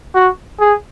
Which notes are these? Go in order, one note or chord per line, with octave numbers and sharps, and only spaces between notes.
F#4
G#4